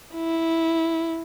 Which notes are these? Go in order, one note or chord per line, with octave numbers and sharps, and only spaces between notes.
E4